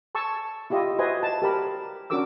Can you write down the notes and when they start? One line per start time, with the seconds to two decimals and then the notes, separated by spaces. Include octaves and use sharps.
0.15 G#5 A5 C#6 E6
0.70 E4 F4 G4 D#5
0.99 F#4 B4 C5 D#5 E5 G#5
1.23 A5
1.42 G4 A#4 B5
2.10 C#4 D4 F#4 A#4 D6 E6